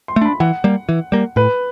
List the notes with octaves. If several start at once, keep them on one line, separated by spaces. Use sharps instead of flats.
C6
A3
D4 B5
E3 F#5
G3 A#3
E3
G3 A#3
A2 B4